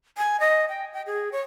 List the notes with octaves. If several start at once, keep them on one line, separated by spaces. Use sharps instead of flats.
G#5
D#5
G5
G5
G#4
C#5